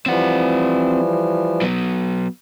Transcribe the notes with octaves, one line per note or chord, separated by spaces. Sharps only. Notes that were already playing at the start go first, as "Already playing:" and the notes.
E3 F3 G3 C4 F#5
F#3 B3